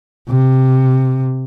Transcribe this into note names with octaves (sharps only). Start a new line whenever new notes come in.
C3